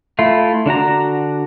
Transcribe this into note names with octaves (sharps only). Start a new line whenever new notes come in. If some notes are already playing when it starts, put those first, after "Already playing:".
A3 E4 F4
D3 D4 F#4 A#5